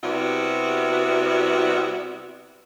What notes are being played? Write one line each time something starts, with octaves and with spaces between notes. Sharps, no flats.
C3 G3 B3 E4 F#4